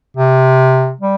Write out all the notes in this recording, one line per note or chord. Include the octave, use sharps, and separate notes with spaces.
C3
G3